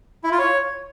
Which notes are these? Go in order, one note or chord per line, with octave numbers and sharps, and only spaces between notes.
E4
F4
C#5